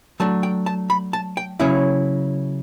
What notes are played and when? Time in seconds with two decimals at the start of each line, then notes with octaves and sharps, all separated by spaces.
0.20 F#3 A3 D4 A5
0.43 G5
0.66 A5
0.90 B5
1.13 A5
1.37 G5
1.60 C#3 F#3 C#4 E4